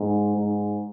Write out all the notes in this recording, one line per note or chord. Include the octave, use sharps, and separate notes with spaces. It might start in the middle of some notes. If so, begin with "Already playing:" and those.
Already playing: G#2
G#2